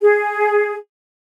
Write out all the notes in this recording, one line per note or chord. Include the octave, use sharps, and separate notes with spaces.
G#4